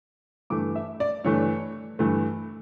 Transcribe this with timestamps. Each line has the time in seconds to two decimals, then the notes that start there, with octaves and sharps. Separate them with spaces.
0.50 G2 E3 A3 D6
0.76 E5
1.00 D5
1.24 G2 E3 A3 C#5
1.99 G2 E3 A3